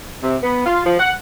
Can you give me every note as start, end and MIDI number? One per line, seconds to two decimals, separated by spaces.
0.22 0.35 48
0.43 0.63 59
0.66 0.84 65
0.86 0.97 53
0.99 1.12 78